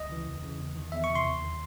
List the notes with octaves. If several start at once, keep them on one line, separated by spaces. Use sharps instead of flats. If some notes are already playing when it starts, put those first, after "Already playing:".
Already playing: C#2 D#5
C#3 E3
E2
C#3 E3
E2
D#3
E2 E5
C#6
C3 E3
C6
D#2
D#3